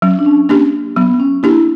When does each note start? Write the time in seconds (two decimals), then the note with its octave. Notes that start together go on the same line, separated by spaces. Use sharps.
0.02 F#3 C#4
0.19 D4
0.26 C#4
0.49 A#3 C#4 D4 G4
0.96 F#3 B3
1.20 C#4
1.43 A#3 D4 E4 G4